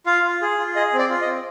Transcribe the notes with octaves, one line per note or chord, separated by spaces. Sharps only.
F4 F5
F4
G#4
F4
G#4 D#5
C4
D5
F4
D#5
C4